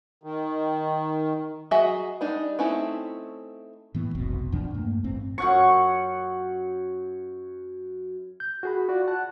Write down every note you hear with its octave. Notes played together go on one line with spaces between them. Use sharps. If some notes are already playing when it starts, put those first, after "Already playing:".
D#3
F#3 F#4 G#4 D#5 E5
G3 D4 D#4
A3 C4 C#4 D#4 E4
A2 E3 B3
F1 B1 B2 C4
F1
E2 B2 F3 D4
G2 A3 A#3
A1 G2 C4
F#2 F#5 C#6
G6
F#4 G#4 B5
F4 F#4 D5
F#5 A5 F#6